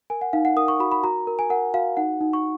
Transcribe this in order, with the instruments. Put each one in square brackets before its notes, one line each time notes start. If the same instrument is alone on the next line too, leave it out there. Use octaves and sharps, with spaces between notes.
[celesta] A#4 G#5
F#5
D#4 F5
F#5
A#4 D#6
C#6
F#4 B5
B5
F#4 A#5
A#4
G#5
A#4 F#5
F#4 F5
D#4 F#5
D#4
C#6